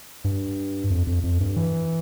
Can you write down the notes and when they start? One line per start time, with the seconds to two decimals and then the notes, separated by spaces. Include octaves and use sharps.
0.24 G2
0.90 F2
1.07 F2
1.23 F2
1.41 G2
1.57 E3